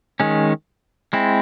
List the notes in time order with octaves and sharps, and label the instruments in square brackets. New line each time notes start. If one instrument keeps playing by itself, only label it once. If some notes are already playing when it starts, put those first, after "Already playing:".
[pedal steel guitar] D#3 G#3 C#4
G#3 C4 E4